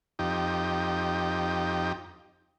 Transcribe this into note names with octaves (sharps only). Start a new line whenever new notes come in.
F2 D#4 G4